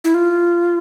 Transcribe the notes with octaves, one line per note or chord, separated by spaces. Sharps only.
E4
F4